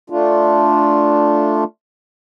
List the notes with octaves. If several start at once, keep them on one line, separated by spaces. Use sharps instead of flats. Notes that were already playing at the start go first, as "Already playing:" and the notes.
A3 D4 F4